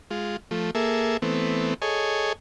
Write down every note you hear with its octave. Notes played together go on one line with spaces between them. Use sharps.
G#3 F4
F3 A3
A#3 G#4 A4 E5
E3 A3 B3 C4
G#4 A4 C#5 D#5 G#5